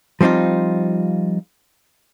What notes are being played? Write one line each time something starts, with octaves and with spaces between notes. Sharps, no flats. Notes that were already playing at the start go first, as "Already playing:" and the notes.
F3 G3 C4 D#4 F4